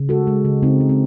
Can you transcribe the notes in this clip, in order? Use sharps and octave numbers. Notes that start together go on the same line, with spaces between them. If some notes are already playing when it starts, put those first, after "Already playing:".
Already playing: C#3
G#3 F#4 A4
G#3
C#3
C#3 C4 D#4
G#3
C4